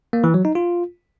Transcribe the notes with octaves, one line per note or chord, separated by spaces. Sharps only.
A#3
E3
F#3
D#4
F4